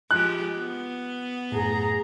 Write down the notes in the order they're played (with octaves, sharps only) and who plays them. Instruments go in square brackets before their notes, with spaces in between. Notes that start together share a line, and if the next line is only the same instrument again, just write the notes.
[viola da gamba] F3 G#3 G4 [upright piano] F#6
[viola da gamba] B3
[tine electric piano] F#2 A2 [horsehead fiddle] G#4 A#5